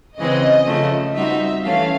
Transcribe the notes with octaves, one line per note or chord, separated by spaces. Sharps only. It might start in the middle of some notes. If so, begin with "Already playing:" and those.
C#3 E3 G#3 C4 D#5
C#3 F3 A3
G3 C4 D#4 F#4 E5
E3 A3 C#4 F5